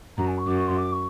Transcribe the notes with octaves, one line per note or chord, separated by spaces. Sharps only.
F#2 A#5
G#5
C#6
F#2 D6
C#6
C6
D6
C#6